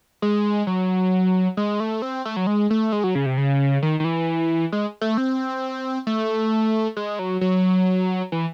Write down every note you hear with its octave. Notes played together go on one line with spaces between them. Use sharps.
G#3
F#3
G#3
A3
C4
A3
F#3
G#3
A3
G#3
F#3
C#3
C3
C#3
D#3
D#3
E3
G#3
A3
C4
A3
G#3
F#3
F#3
E3